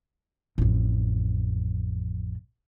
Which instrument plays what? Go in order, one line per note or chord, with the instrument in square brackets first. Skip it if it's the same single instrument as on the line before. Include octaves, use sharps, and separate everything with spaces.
[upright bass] A1 F2